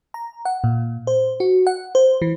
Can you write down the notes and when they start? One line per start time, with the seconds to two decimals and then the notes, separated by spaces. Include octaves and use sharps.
0.14 A#5
0.45 F#5
0.64 A#2
1.07 C5
1.40 F#4
1.67 F#5
1.95 C5
2.22 E3